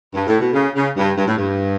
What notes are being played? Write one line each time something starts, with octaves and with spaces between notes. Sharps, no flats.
G2
A2
B2
C#3
C#3
G2
G2
A2
G2